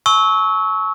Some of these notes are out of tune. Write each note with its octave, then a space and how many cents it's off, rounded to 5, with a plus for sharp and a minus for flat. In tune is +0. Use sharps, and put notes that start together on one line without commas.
A5 -35 C#6 +0 E6 -30